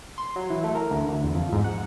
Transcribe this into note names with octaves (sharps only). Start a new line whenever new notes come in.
C6
F#3
E3
A3
A#4
D2
D2
E2
F2
G#2
F#5